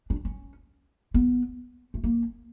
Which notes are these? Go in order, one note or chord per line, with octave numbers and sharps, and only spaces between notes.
D4
C#4
B3
A3
A#3